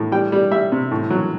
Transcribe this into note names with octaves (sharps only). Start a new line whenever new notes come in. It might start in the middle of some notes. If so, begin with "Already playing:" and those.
Already playing: A2
G3 G5
G3
G3 E5
C3
A2
F#3